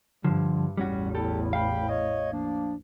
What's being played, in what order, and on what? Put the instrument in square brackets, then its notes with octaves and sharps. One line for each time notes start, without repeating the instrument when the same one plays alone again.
[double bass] G2 [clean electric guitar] D3 F3
[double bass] A1 E2 [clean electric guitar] G3 C#4 F#4
[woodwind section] F#3 B3 E4 [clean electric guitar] G4 A4
[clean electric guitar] F5 [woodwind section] G5 B5
[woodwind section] C#5 D#5
F3 A#3 D4